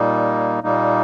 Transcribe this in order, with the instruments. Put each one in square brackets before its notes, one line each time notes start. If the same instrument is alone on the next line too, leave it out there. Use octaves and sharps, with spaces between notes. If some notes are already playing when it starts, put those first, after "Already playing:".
Already playing: [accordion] A#2 G3 A#3 D#4
A#2 G3 A#3 D#4